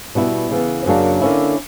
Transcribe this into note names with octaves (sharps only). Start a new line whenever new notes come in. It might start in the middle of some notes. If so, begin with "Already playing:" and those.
B2 G3 B3 E4
C#3 E3 B3
F#2 C#3 F#3 A#3 D4
D3 A#3 C#4 E4